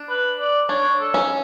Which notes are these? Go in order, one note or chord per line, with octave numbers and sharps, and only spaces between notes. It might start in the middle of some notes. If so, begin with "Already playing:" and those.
Already playing: D4
B4
D5
D4 C#5
A4
C#4